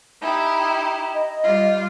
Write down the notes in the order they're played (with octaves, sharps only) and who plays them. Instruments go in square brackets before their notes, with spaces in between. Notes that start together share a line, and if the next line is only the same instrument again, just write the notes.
[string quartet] D#4 E4 G4
[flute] D#5
[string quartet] G3 F4